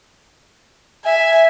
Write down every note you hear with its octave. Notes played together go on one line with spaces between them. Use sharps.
E5 G#5